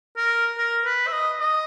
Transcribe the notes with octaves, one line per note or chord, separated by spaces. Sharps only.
A#4
A#4
B4
E5
D#5
D#5